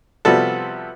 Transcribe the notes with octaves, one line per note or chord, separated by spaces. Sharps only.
C3 F3 G3 B3 F#4 A4